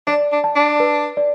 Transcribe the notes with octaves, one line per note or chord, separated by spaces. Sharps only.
D4 D5
D4
A5
D4
B4
D5